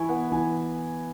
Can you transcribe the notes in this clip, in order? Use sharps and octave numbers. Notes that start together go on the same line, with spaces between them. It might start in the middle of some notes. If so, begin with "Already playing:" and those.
Already playing: E3 E4 G#5 C#6
B3 F#5
E3 G#5